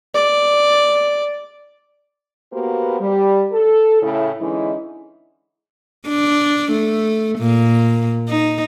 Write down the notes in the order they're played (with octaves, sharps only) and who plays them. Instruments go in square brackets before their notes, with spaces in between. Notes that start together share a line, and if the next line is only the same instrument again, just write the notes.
[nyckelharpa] D5
[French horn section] A#3 B3 F#4 G4 B4 C5
G3
A4
A2 C#3 E4
D3 E3 G#3 C#4 D#4 E4
[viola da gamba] D4
A3
A#2
D#4